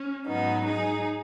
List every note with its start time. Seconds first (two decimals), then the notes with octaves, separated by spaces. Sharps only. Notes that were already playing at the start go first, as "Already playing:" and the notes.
Already playing: C#4
0.27 G#2 F#3 B3 D#4
0.66 D#4 G#4